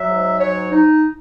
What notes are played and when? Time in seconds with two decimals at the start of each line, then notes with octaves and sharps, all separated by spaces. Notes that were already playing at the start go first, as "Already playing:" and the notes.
Already playing: F#3 E5
0.09 G#2
0.40 F#3 C#5
0.71 D#4